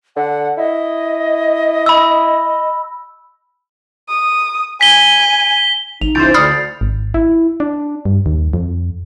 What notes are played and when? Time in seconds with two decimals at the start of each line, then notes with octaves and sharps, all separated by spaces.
0.16 D3 F#5
0.57 E4 D#5
1.86 B5 E6
4.09 D#6
4.81 G#5 B6 G7
6.01 G#1 D#4 F7
6.15 C#2 E3 C5 G6 A6 D7
6.34 D2 D5 B5 D#6 F6 C7 C#7
6.81 G#1
7.14 E4
7.60 D4
8.05 G2
8.26 D#2
8.53 F2